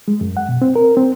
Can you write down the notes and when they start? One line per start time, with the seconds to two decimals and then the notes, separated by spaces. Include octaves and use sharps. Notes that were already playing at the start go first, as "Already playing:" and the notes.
0.08 G#3
0.21 F#2
0.37 F#5
0.49 B2
0.62 C4
0.76 A#4
0.97 C4